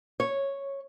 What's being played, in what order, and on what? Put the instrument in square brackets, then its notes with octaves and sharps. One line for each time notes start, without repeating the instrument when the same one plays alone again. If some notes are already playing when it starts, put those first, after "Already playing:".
[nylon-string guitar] C#5